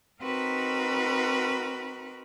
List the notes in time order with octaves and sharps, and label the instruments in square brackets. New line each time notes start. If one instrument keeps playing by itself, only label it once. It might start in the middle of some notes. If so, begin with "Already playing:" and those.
[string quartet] C4 D#4 F#4 A#4 B4 B5